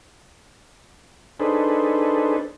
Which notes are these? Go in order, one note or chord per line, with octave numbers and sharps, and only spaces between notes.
D4 D#4 G#4 A4 B4 C5